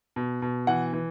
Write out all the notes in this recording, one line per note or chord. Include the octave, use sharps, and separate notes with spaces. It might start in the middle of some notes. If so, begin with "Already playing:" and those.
B2
B2
E3 F#5
E3